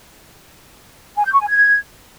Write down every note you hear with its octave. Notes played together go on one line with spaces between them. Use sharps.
G#5
G6
C#6
G#5
G#6